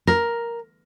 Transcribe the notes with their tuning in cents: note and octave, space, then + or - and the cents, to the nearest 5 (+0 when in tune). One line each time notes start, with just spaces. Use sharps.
A#4 +5